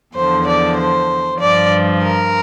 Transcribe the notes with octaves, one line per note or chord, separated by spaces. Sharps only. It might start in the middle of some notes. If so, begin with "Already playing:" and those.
E2 D3 F3 C5
D5
C5
G2 F3 D5
A#4